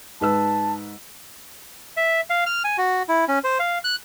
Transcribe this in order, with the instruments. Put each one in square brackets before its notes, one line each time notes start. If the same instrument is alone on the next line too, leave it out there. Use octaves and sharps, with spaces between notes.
[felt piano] G#2 B4 E6 [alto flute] A5
[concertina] E5
F5
F6
G#5
F#4
E4
C#4
C5
F5
F#6